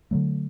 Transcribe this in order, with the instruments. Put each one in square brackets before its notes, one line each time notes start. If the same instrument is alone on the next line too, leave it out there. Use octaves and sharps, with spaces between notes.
[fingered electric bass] D3 F#3 A3